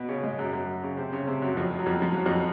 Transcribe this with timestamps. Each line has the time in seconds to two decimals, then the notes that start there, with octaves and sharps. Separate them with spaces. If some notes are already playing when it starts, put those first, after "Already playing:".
Already playing: B2 B3
0.09 C#3 C#4
0.23 G#2 G#3
0.38 F#2 F#3
0.53 F#2 F#3
0.83 C#3 C#4
0.97 C3 C4
1.13 C#3 C#4
1.27 C3 C4
1.42 F#2 F#3
1.57 F2 F3
1.79 F#3
1.86 F2 F3
2.02 F3
2.14 F#3
2.26 F2 F3